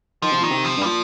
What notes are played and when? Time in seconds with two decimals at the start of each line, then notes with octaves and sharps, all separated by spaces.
0.22 D#3 F3
0.32 C3
0.41 A#2 D#3
0.50 C3
0.65 F3
0.77 G2
0.81 G3
0.85 A#2 F3